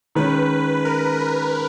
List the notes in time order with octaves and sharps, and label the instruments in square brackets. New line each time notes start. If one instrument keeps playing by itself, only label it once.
[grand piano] D#3 G#3 C#4 [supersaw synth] B4
[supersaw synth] A#4
A#4